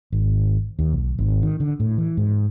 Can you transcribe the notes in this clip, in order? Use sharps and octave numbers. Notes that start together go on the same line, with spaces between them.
G#1
D#2
B1
G#1
D#3
D3
A2
E3
G#2